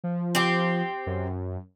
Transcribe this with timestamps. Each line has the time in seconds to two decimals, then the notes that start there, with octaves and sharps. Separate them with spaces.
0.04 F3
0.35 C4 G4
1.07 F#2